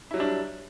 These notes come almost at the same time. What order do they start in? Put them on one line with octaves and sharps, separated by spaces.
E4 F#3 G3 D4